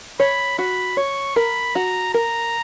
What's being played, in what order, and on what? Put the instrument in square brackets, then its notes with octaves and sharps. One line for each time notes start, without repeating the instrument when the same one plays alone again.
[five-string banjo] C#5 [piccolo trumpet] B5
[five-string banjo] F#4 [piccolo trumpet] B5
[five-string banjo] C#5 [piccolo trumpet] C#6
[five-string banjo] A#4 [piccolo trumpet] B5
[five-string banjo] F#4 [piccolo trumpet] A#5
[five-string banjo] A#4 [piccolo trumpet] A#5